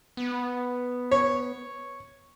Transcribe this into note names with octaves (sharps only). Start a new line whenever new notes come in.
B3
C#5